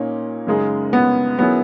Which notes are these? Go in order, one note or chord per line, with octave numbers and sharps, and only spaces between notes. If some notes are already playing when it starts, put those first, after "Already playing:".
Already playing: A#2 A#3 C#4 D#4
F#2 C#3 G#3 D#4 G#4
B3
D#3 F#3 B3 C#4 E4 G#4